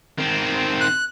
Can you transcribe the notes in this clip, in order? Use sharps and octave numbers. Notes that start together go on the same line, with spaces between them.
D#3 C4
F#6